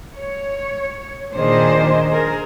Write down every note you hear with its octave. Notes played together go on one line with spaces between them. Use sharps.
C#5
A#2 D#3 D4 G#4 C5 D#5
G#4 A#4 C5